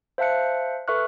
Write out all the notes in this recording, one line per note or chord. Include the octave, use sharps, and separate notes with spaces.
C5 E5 F5 A5 F#6 C#7
A4 B4 E5 C#6 F6 F#6